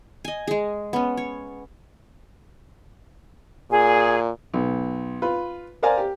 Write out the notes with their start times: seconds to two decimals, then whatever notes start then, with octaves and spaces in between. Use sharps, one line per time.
0.25 D#5 G#5
0.47 G#3 G#4
0.93 B3 C#4
1.17 C#5
3.70 A#2 G#4
4.54 B1
5.22 F4 B4
5.83 A#4 C5 D5 F5 G#5 A#5
5.98 G4